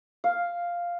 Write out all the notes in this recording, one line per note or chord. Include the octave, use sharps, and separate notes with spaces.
F5